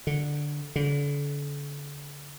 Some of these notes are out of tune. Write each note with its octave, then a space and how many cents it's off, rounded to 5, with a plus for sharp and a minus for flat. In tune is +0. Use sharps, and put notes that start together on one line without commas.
D3 +0
D3 -35